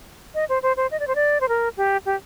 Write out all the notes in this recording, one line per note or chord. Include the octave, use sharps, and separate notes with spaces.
D#5
C5
C5
C5
D#5
D5
C5
D5
C5
A#4
G4
G4